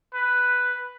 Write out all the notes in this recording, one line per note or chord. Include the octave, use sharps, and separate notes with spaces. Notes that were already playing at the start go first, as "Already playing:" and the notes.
B4